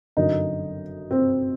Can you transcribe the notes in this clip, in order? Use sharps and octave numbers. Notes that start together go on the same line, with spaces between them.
G1 F#2 D3 D#4
C4